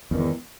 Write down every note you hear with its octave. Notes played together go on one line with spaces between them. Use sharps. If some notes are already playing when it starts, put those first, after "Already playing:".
E2 G#2 D#3